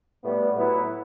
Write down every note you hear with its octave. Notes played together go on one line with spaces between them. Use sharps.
A2 G3 B3
A2 F#3 B3 E4 B4